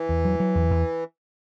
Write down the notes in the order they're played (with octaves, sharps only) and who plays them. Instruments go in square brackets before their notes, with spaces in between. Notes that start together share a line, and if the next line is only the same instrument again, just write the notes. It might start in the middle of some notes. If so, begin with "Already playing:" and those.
Already playing: [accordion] E3
[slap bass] E2
F#3
F#3
E2
E2